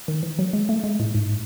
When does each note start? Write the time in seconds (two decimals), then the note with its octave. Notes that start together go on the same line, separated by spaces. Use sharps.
0.08 D#3
0.23 E3
0.39 F#3
0.53 G#3
0.69 A3
0.84 G#3
1.00 A2
1.15 G#2